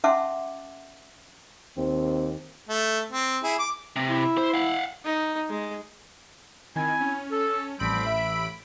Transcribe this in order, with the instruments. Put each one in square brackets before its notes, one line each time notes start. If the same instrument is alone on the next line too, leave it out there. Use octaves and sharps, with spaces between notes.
[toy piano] C#4 E5 F#5 A5 C6 D6
[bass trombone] D#2 [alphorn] C4
[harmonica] A3
C4
E4 G#4
D6
[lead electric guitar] C3
[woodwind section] E4
[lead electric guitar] C5
F5 F#5
[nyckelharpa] D#4
G#3
[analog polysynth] D#3 [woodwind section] C4 E4 G#5
[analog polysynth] C#4
[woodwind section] A4
[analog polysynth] A1 B5 D7 [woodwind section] F3 G3 C4
[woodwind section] E5